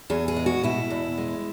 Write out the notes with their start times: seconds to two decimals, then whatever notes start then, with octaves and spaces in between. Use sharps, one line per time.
0.10 E2 G#4
0.28 G#4
0.36 G#3
0.46 F#4
0.63 B2 E4
0.90 E2
1.18 G#3